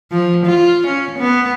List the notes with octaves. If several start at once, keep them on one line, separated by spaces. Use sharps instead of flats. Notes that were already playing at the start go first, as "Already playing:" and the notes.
F3
F4
C#4
B3